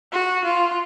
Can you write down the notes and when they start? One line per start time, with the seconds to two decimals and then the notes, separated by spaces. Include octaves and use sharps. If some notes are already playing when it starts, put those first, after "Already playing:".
0.12 F#4
0.44 F4